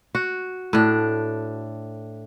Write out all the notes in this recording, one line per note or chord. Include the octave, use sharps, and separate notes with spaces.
F#4
A2 D4